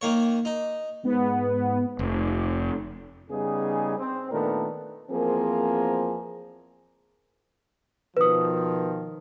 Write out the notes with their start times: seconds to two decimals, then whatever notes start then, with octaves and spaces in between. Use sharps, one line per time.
0.01 D#3 A#3 C#5
0.45 D#4
1.03 G#2 B3
1.99 F1
3.30 C#3 G3 B3 D#4 G#4
3.98 C4
4.31 A#2 D#3 A3 B3 D4 A#4
5.11 E2 F3 A#3 C4 G#4 A#4
8.17 B2 D#3 F3 B4 D#6